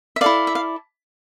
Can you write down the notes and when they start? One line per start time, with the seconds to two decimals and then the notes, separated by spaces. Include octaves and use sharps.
0.16 E5
0.21 E4 A4 D5 F5
0.47 E5
0.55 F5